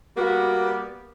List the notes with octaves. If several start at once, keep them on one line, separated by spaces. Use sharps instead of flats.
G3 A#3 B3 F#4